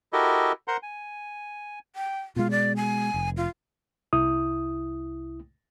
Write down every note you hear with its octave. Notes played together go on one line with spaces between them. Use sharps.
E4 F#4 G4 A4 A#4 D#5
A#4 C5 F#5 A#5 C6
G#5
G5
B2 G#3 F4
D5
G#5
F1
F4
C2 E4 D#6